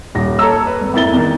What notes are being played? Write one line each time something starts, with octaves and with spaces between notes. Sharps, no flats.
D#1 A#6
A4 C#5 A#5 E6
B4
G#1
F2 A#3 E4 A6 G7
E2 D#3